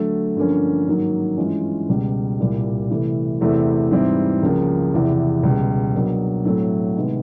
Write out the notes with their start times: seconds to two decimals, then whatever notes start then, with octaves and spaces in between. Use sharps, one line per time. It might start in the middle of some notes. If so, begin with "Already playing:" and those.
Already playing: D3 F#3 A3
0.36 G2 D3 F3 A#3 C#4
0.87 G#2 D#3 F#3 A#3
1.38 G2 E3 G#3 C#4 F4
1.89 C#2 B2 G3
2.39 C2 A#2 G3
2.91 C3 E3 A3
3.41 E2 C3 E3 A3 C4
3.91 G#2 E3 G3 C4 E4
4.43 C#2 C#3 F3 A#3
4.94 E2 C3 E3
5.43 C#2 B2 G3
5.95 B2 F#3 A#3 D4
6.45 A2 F#3 A3 C4 E4
6.96 C3 D#3 G#3 B3